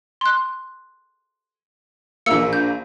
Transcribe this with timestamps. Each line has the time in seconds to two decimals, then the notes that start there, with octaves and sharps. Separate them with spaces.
0.21 C6 F#6
2.26 A#1 A#3 E6 C#7
2.53 G6